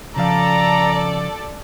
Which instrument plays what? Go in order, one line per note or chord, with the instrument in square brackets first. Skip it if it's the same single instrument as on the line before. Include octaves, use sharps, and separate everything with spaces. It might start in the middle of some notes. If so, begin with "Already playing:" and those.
[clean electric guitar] C#3 F3 F5 [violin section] A4 D5 A5 [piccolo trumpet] A#5